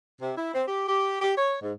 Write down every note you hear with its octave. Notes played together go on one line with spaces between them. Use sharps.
C3
E4
C4
G4
G4
G4
C#5
G#2